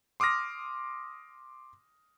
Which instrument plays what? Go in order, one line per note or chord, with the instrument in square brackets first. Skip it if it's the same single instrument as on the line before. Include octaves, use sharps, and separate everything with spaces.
[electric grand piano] C6 D6 D#6 F6 A#6